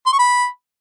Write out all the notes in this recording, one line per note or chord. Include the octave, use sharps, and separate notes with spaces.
C6
C#6
B5